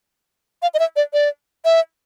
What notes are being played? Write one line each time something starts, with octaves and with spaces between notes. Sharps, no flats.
F5
D#5
E5
D5
D5
E5